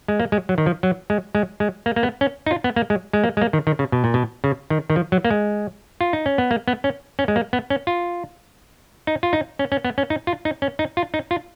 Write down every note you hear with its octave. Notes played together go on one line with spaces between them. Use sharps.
G#3
A#3
G#3
F#3
D#3
F3
F#3
G#3
G#3
G#3
A#3
A#3
B3
C#4
D#4
F4
B3
A#3
G#3
G#3
A#3
G#3
A#3
D#3
D#3
C#3
B2
A#2
B2
C#3
D#3
D#3
F3
F#3
A#3
G#3
F4
D#4
C#4
B3
A#3
B3
C#4
C#4
G#3
A#3
B3
C#4
F4
D#4
F4
D#4
C#4
C#4
B3
C#4
D#4
F4
D#4
C#4
D#4
F4
D#4
F4